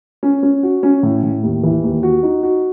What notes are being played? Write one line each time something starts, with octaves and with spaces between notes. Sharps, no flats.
C#4
C#4
F#4
C#4
A2
A2
D#2
E3
D#2
F#4
D#4
F#4